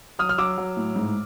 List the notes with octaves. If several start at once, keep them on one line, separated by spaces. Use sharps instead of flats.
F#3 D#6 F6
F6
F#3 D6 E6
F#3
A2
G#2